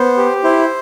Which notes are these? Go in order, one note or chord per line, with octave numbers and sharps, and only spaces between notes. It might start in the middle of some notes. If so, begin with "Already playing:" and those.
Already playing: B3 C5
G4
E4 C5